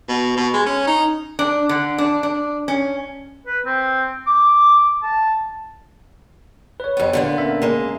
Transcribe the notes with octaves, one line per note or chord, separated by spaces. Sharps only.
B2
B2
G#3
C#4
D#4
D4
D3
D4
D4
C#4
B4
C4
D6
A5
B4 C#5
F2 B3
A#2 D3 B3
C#4 A#4 E5
G#3 A#3